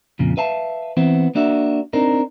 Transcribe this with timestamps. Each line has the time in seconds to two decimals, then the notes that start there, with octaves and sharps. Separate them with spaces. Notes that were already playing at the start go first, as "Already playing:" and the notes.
0.19 F2 A#2 C#3
0.37 B4 E5 F5 A5
0.97 E3 B3 C4 E4
1.35 A#3 D4 F#4 E5
1.93 C4 D4 D#4 A#4